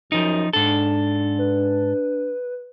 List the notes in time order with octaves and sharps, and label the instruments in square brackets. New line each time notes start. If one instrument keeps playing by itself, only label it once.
[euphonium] F#2 [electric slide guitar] F3 D#4
[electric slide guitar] G#2 A4 [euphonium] D4
[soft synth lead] B4